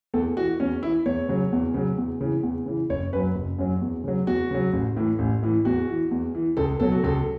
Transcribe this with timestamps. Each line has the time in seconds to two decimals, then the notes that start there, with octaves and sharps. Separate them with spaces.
0.14 E2 A4
0.37 E3 F#4
0.60 E2 C#4
0.82 E3 E4
1.06 E2 C#5
1.29 C#3 F#3
1.52 E2
1.74 C#3 F#3
1.98 E2
2.21 C#3 E3
2.43 E2
2.66 C#3 E3
2.89 F#1 C#5
3.13 F#2 B4
3.16 F#3
3.35 F#1
3.59 F#2 F#3
3.81 E2
4.04 C#3 F#3
4.27 E2 F#4
4.51 C#3 F#3
4.73 A1
4.96 A2 E3
5.19 A1
5.42 A2 E3
5.65 E2 F#4
5.89 E3
6.11 E2
6.35 E3
6.57 C#2 A4
6.80 B2 F#3 A4
6.92 F#4
7.04 C#2 A4